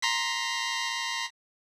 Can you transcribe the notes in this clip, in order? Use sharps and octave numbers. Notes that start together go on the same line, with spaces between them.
A#5 C6 B6